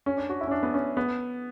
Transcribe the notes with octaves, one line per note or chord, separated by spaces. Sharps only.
C#4
D4
F#4
E4
C#4
D4
B3
C#4
B3